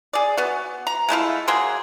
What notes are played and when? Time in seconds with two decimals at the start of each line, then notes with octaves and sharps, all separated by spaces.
0.13 G#4 D5
0.37 B3 F#4
0.87 A#5
1.09 G#3 A3 E4 F4
1.48 F#3 A#3 G#4 C6